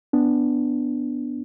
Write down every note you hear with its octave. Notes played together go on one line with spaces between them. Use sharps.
B3 D4